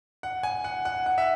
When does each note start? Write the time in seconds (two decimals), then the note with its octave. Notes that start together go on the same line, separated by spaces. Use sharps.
0.23 F#5
0.43 G#5
0.64 F#5
0.85 F#5
1.06 F#5
1.18 E5